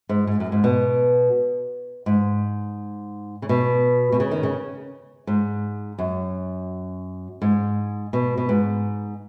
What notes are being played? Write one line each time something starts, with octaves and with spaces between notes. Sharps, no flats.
G#2
G#2
F#2
G#2
B2
G#2
C#3
B2
B2
C#3
D#3
C#3
G#2
F#2
G#2
B2
B2
G#2